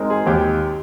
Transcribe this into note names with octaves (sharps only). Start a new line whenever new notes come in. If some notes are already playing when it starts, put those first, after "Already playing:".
Already playing: G#3 C4 D#4 A#4
G#4
D#2 G4